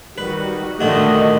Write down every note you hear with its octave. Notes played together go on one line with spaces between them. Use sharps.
D#3 G3 F#4 B4
A#2 D3 D#3 A3 F#4 D#5